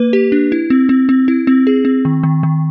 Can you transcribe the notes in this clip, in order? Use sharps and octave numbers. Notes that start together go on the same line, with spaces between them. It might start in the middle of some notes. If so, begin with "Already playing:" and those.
Already playing: A#3 B4
G4
D4
E4
C4
C4
C4
E4
C4
G#4
C4
D#3
D#3
D#3